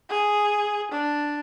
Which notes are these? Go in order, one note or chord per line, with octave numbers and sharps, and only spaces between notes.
G#4
D4